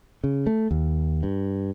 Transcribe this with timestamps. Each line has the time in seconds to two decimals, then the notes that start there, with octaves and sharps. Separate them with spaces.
0.24 C#3
0.46 A3
0.71 D#2
1.23 G2